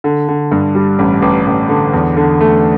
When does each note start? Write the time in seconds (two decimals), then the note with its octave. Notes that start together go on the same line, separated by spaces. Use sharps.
0.04 D3
0.29 D3
0.52 G2
0.75 G3
0.99 A1
1.22 A1
1.46 A1
1.69 D3
1.93 E2
2.17 D3
2.41 A3